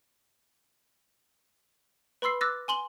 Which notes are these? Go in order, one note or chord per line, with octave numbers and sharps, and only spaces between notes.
B4 B5 C6 E6 C7
D6 E6 F#6 A6 A#6
G#5 C6 F#7 G7